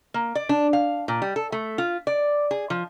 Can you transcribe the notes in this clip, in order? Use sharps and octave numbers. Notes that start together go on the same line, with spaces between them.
A#3
D5
D4
F5
A#2
G3
A4
A3
F4
D5
G#4
F3